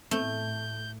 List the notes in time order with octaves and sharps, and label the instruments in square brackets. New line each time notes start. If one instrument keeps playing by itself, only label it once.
[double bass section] A2 [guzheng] A3 [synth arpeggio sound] B3 C4 [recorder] G6